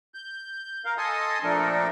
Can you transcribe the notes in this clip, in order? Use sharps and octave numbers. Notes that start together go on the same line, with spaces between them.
G6
A#4 F5
A4 D#5 G#5 A5 C6 D#6
A#2 F3 A3 D4 A4 A#4